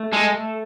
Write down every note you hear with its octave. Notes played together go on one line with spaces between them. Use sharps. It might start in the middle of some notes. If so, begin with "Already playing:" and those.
Already playing: A3
G#3 A4
A3